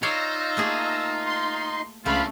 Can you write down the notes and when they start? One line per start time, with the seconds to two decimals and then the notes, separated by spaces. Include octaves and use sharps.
0.03 D#4 F4 C#5 D5 F5 E6 A#6
0.57 A3 A#3 G#4
1.26 C6
2.06 C#2 C#3 A3 D4 F4 F5 B5